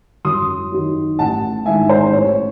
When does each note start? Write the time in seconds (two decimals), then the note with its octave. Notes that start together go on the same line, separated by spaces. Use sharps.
0.25 F#2 C6 D#6
0.72 D#3 F#3
1.18 A1 F#5 A5
1.66 G#2 D#3 E5 G#5
1.89 C5
2.13 A1 C#5